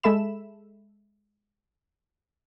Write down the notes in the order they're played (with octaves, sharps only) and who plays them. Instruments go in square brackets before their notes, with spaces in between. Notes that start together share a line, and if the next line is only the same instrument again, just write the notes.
[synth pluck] G#3 A4 E5 B5 E7